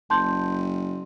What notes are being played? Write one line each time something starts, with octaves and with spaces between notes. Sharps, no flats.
F#1 A5 C6 G6